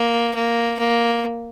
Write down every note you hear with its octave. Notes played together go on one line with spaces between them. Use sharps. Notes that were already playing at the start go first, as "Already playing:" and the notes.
Already playing: A#3
A#3
A#3